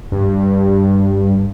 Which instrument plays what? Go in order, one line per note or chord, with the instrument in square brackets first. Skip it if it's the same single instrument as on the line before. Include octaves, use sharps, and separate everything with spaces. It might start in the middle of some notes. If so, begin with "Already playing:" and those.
[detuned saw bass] G2